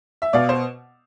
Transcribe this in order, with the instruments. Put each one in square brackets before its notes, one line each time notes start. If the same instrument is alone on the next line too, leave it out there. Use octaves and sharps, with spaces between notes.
[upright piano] E5
B2 D5 F5
C5